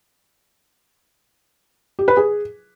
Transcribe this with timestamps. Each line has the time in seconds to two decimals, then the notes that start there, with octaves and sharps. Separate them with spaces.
1.99 G4
2.08 B4
2.17 G#4